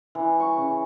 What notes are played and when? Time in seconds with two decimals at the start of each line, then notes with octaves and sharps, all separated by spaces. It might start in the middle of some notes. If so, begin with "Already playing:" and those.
0.15 E3
0.40 C#6
0.57 C#3